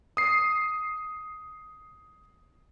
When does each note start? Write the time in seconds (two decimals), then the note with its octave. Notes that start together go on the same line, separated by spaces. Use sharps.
0.17 D#6 C7